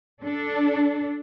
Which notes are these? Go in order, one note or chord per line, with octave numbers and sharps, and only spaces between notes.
D4 A4